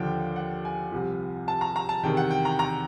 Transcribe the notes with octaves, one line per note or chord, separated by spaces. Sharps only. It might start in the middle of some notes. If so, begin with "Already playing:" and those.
Already playing: D#2 D3 F3 G5
F#5
G#5
C2 C3 F3
A5
A#5
A#5
A5
E2 C3 D#3 G5
F#5
G5
A#5
A#5